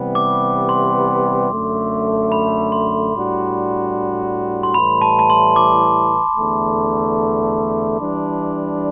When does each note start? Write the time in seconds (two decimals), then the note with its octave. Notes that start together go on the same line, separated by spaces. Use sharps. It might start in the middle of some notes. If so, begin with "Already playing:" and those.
Already playing: C3 E3 G3 B3
0.15 D6
0.69 C6
1.51 F#2 D3 A3
2.32 B5
2.72 C6
3.13 A2 G3 D4 F#4
4.63 C6
4.74 A2 E3 G3 B5
5.02 A5
5.19 A5
5.30 C6
5.56 D6
6.37 E2 D3 A3
7.99 E3 G3 D4